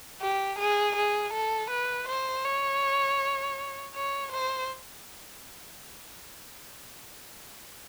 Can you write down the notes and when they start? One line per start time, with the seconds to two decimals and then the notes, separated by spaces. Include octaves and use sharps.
0.21 G4
0.59 G#4
0.96 G#4
1.33 A4
1.70 B4
2.08 C5
2.45 C#5
3.95 C#5
4.32 C5